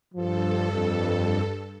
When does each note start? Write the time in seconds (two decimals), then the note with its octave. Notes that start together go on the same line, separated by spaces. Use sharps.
0.14 G2 F3 A4
0.73 F2